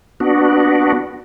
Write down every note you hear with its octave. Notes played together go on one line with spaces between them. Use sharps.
B3 D4 F#4